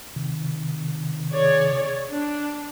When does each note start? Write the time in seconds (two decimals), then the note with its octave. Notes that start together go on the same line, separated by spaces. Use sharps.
0.16 C3 D#3
1.31 G#4 C#5 D5
2.10 D4